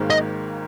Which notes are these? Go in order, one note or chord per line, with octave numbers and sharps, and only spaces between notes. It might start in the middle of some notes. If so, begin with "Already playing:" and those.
Already playing: G#1 G#2 D#3 A#3
D#5